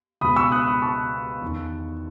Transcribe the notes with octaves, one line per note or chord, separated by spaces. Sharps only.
C#2 B2 B5 D#6
C#6 E6
D#6 F#6
B5 D#6
A5 C#6
E2 D#3